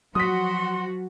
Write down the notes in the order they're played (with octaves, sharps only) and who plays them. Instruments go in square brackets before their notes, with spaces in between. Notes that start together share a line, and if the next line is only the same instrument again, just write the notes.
[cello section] F3 F#4 [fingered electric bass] F#3 [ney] C6 [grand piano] D#6 B6